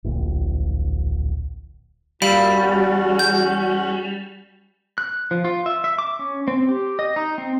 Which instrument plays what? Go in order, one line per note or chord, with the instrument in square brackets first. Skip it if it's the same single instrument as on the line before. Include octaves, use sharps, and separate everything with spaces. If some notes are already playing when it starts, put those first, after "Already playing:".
[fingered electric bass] D1 A#1
[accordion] F#2 A#2 E6 [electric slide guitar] G3 [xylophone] F5 B5 D7
[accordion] E2 C#4 F#4
[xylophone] G6
[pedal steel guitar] F#6
F3
F4
E5
E5
D6
C#4
C4
G4
D#5
D#4
C4